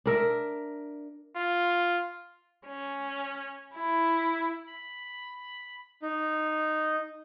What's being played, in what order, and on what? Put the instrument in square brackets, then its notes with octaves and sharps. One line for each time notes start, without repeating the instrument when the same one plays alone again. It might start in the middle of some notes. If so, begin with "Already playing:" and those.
[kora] D4 A#4 E5
[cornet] F4
[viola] C#4
E4
[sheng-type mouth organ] B5
D#4